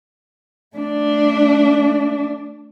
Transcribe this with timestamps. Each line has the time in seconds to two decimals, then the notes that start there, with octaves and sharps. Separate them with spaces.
0.76 A3 D4